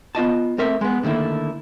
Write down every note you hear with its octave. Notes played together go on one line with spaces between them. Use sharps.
B3 F4 D#5 A5
A3 C4 A#4 C#5 E5
G#3 B3
D3 D#3 A3 A#3 E4